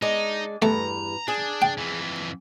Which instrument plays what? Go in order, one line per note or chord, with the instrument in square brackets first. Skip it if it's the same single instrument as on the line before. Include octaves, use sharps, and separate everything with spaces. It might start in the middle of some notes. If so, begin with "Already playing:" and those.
[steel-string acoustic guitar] G#3 D4 D5 [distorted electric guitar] D#4
[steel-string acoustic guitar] E2 G2 [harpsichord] A3 [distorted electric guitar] A#5
[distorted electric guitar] D4 [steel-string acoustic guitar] G#4
[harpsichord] G5
[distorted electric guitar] F2 E3